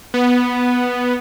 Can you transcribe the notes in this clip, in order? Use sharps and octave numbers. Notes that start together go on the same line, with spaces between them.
B3